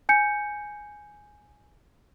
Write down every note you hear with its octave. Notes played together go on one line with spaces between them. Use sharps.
G#5 G6 C#7